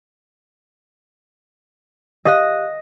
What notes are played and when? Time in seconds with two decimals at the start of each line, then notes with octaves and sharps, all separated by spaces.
2.25 G4 D#5 F5 D#6 F#6 A#6